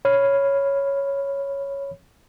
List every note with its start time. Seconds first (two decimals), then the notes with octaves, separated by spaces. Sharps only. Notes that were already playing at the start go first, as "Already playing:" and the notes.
0.05 C#5 B5 F6